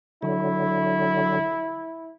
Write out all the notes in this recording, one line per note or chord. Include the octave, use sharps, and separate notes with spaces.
D3 F#3 E4